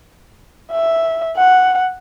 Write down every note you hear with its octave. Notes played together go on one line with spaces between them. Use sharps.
E5
F#5